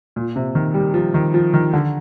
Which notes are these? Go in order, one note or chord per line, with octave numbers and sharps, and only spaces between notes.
A#2
C3
D#3
G3
F3
D#3
F3
D#3
D3